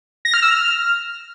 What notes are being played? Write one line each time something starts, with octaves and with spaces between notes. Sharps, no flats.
A#6
F6
E6
F6